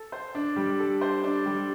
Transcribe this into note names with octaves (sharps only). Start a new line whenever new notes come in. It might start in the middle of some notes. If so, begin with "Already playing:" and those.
Already playing: A4
C5
D4
G3
A4
C5
D4
G3